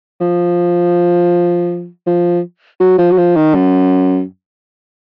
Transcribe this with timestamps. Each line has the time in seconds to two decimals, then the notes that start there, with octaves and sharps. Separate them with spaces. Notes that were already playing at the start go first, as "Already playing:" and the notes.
0.21 F3
2.07 F3
2.80 F#3
2.98 F3
3.12 F#3
3.18 F3
3.36 D#3
3.55 F#2